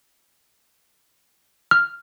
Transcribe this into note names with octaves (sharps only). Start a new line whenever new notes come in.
F6